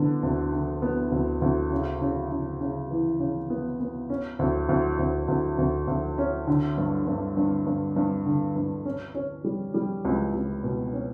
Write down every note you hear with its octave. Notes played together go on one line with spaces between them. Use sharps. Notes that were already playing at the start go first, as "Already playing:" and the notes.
Already playing: D3 B3
D2
D3
B3
D2
D2
C#3
C#3
C#3
C#3
E3
C#3
B3
B3
C#4
D2
D2
D2
D2
D2
D2
C#4
D3
G2
G2
G2
G2
G2
D3
G2
C#4
C#4
G3
G3
C#2
C#2
B2
C#4